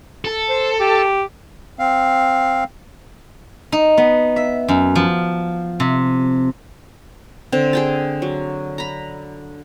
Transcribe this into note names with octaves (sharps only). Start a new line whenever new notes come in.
A4
C5
G4
C4 F5
D#4
B3
E5
F#2
F3
C3
D3 C4
G#4 G5 A5
F#3
A#5 B5